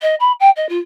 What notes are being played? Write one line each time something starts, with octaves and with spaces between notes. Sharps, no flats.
D#5
B5
G5
D#5
F4